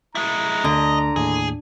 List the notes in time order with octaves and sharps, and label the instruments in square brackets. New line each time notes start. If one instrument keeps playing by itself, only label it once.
[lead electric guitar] G#3 E4 [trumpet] A#5
[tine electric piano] D2 [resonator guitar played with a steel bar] D3 [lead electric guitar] D#5
[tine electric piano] D#2 A2 [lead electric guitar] G#4